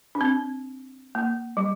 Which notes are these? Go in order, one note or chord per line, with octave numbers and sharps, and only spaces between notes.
D4
C4
A#3
G3